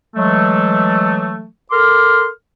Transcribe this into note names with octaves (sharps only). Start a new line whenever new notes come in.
E3 F#3 G#3 A3
A4 A#4 C6 D6 F6